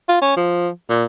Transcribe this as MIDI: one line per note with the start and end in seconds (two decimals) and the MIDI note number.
0.09 0.21 65
0.22 0.33 61
0.36 0.69 53
0.89 1.05 46